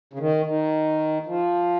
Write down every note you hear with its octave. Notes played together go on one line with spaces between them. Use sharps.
C#3
D#3
D#3
F3